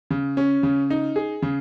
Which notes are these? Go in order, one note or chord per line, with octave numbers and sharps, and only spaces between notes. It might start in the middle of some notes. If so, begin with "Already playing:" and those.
C#3
C#4
C#3
D#4
G#4
C#3